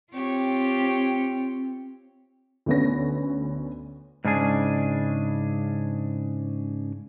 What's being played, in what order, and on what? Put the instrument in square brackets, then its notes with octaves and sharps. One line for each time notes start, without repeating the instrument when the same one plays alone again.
[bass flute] C4 [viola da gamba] F4 G4 C#5
[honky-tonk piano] D2 A3 B3 C#4 A#6
[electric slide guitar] G#2 C#3 D4 G#4